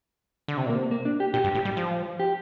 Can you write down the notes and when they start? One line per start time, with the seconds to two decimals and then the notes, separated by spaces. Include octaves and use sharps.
0.48 D3
0.57 C3
0.66 A#2 A#3
0.75 C3
0.91 A#3
1.05 D4
1.20 G4
1.34 A#2 G4
1.44 G2
1.55 A2
1.65 G3
1.77 F3
2.20 G4